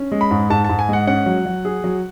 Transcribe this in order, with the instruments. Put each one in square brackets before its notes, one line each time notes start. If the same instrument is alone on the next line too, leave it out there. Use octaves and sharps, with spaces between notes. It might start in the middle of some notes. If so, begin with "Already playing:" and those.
Already playing: [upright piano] C#4
G#3
[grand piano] B5
[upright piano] G#2
[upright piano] G#2 [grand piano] A5
[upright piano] G#2 [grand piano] A5
[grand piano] G#5
[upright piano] G#3 [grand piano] F#5
[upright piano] C#4 [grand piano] F#5
[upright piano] F#3
F#3
G#4
F#3